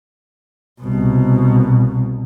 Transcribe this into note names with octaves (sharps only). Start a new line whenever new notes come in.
C2 B2